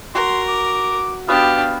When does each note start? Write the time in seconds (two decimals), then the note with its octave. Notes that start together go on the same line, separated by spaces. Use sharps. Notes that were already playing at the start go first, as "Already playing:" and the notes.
0.15 F#4 A#4 C6
0.48 D6
1.28 B3 D4 F#4 G4 F5